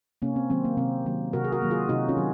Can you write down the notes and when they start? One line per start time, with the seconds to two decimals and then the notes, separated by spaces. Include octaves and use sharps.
0.22 C3 A#3 C#4
0.36 C4
0.50 D#3 F#3 A#3 C4
0.65 A#3
0.77 C3 C4
1.06 D#3 F#3 A#3
1.33 C3 F#4 A#4
1.44 G#4
1.52 F#4 A#4
1.62 D#3 F#3 A#3
1.70 F4 G#4
1.89 C3 D#4 F#4
2.09 C#4 F4
2.17 D#3 F#3